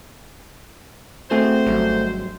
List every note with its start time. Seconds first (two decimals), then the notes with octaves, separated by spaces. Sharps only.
1.31 A3 C4 F#4 G#4 C5
1.66 G#1 G2 F#3